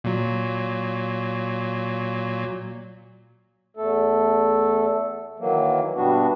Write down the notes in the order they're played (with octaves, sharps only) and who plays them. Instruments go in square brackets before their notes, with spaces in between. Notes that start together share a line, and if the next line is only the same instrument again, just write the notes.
[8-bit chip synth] A#2 F#3
[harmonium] E2 A3 A4
D#3 E3 F#3 A#3
G2 B2 G3 B3 D4 F#4